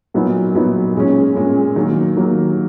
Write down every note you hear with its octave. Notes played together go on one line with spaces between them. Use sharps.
A#2 F#3 B3 D#4
A#2 F#3 B3 D#4
A#2 G#3 C#4
A#2 G#3 C#4
D#3 F#3 A#3
D#3 F#3 A#3